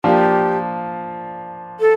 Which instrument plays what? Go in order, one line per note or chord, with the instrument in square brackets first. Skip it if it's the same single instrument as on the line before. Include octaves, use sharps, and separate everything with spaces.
[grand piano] F3 A#3 D4 F4 [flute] G4
[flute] A4